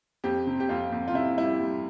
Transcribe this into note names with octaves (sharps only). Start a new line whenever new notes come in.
F2 G4
C3
G4
F2 F4
F2
F4
C3 E4
G3 E4
G3